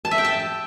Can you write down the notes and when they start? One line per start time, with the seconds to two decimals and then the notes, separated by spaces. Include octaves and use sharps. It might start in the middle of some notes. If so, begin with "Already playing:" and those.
0.05 A5
0.11 E5
0.18 G5
0.25 A5